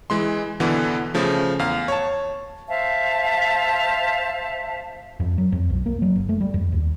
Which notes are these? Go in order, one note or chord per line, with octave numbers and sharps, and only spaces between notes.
E3 G#3 C6
B2 D3 E3 B3
C#3 F3 A3
E2 F5
C#5 A5
C5 E5 F5 A5
F2
F#3
F2
B1
A#3
F#3
F#1
A3
G3
F2
D#2